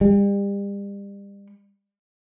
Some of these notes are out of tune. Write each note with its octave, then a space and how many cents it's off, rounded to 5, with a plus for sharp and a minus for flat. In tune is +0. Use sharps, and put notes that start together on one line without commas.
G3 +35